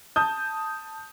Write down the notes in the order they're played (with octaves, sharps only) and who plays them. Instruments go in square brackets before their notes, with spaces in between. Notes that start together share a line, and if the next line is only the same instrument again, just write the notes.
[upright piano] A5 D#6 G6